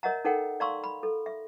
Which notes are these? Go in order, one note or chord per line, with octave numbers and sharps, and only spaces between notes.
A#4 C#5 D#5 E5 F#5 A#5
D#4 A4 A#4 C#5 F#5 G5
D5 F5 A#5 C6 C#6 E6
B5
A4
E5